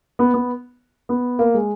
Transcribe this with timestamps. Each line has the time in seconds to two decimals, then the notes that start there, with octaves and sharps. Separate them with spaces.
0.19 B3
0.34 B3
1.09 B3
1.39 A#3
1.54 G#3